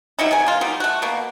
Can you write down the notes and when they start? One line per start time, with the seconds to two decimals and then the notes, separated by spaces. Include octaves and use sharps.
0.19 F#3 G3 D#4 E4
0.31 C3 A#4 G#5
0.46 A#3 F4
0.61 F#3 G3 D#4
0.80 A3 F#4
1.02 B2 A#3